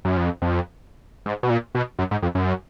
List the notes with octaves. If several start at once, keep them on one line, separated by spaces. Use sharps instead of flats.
F#2
F2
F2
G#2
B2
A#2
B2
F#2
G#2
F2
F#2